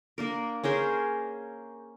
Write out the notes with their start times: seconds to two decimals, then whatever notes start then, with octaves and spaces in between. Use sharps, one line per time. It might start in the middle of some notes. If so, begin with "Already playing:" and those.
0.18 A#3 D4 A#4
0.64 C#4 G#4 A#4 C5